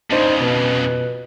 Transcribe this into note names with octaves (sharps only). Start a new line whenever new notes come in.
F2 C#3 D4 D#4 C5
B2 B4